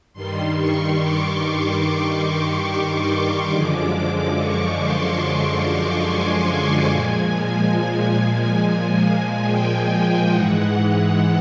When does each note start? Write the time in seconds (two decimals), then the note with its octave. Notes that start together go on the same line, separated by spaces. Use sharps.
0.13 G2 D#3 G3 C6
0.56 C#6
0.99 D6
1.83 C#6
2.26 D6
3.53 F#2 D3 F3 G#3
4.37 C#6
4.80 C6
5.22 D6
5.65 C#6
6.07 G#5
6.92 A#2 F3 G#3
9.46 G5
10.30 G#2 E3 G#3 F#5